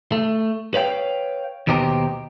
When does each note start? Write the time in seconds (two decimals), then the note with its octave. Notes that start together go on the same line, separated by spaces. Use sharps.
0.12 A3
0.74 B4 C#5 F5 G5
1.67 D#2 B2 D#4 G4 C5 A#5